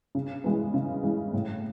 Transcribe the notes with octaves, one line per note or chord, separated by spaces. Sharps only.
C#3
E3 G#3 B3
C#3
E3 G#3 B3
A2